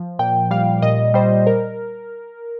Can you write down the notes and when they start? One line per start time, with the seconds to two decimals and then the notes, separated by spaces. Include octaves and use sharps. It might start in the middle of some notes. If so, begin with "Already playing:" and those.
Already playing: F3
0.19 A#2 G5
0.51 G3 F5
0.82 A#2 D#5
1.14 G3 C5
1.47 A#4